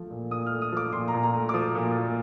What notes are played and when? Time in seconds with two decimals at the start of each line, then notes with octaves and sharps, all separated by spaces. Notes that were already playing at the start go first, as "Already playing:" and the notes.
Already playing: F3 A3
0.10 A#2
0.31 A#2 D#6
0.46 F6
0.51 A3
0.62 D#6
0.72 F3 D6
0.92 A#2 C6
1.08 A#5
1.14 A#2
1.23 A#5
1.34 A3
1.49 D6
1.54 F3 D#6
1.75 A#2
1.96 A#2